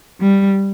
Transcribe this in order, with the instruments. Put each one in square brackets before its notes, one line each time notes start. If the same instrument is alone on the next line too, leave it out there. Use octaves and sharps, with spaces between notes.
[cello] G3